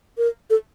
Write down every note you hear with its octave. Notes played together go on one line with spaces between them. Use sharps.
A#4
A4